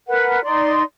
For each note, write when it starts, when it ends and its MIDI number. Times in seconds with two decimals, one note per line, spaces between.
0.07 0.43 70
0.07 0.43 71
0.07 0.43 78
0.43 0.82 63
0.43 0.82 74
0.43 0.82 84